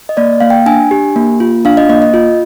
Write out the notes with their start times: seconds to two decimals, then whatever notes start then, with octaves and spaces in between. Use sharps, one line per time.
0.09 D#5
0.17 A#3 D5
0.40 A#3 F5
0.50 G5
0.66 D4 G#5
0.91 G4
1.16 A#3
1.40 F4
1.65 D4 F5
1.77 D#5
1.89 A#3 D#5
2.02 D#5
2.14 F4